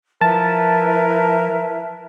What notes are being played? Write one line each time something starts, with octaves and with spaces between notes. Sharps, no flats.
F3 E4 A#4 B4 E5 A5